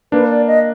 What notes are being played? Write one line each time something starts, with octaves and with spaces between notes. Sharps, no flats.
A#3 D4 B4
D5
D#5